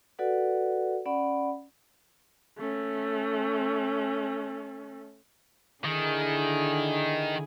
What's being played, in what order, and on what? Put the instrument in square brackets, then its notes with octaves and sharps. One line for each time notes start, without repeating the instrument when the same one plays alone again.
[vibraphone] F#4 A4 B4 D5 F#5
C#4 D5 F#5 B5
[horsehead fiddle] A3 C#4
[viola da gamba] D3 E4 G#4 [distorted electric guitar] D#3